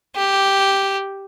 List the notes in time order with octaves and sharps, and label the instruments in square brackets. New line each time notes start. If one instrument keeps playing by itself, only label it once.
[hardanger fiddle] G4